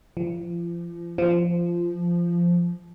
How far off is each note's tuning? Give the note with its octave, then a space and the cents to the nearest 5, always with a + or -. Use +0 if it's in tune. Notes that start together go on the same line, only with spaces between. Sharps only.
F3 -35
F3 -15